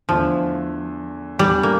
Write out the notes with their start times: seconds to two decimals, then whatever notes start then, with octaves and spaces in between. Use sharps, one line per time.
0.09 E2 D3 F3 A3 E4
1.39 E2 E3 G3 A3 D4
1.63 A#3